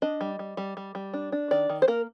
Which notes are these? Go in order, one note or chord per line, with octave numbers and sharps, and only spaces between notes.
D4 D#5
G3
G3
G3
G3
G3
D4
D4
D#3 D5
D#3
C5
A#3 A#4